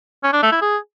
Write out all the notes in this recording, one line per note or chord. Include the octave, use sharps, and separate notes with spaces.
C#4
D4
A3
E4
G#4